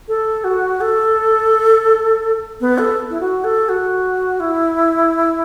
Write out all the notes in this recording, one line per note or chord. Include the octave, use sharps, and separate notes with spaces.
A4
F#4
A4
B3
A4
E4
F#4
A4
F#4
E4